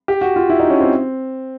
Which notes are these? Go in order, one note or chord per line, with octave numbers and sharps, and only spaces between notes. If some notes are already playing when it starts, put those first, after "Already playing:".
G4
F#4
F4
E4
D#4
C#4
C4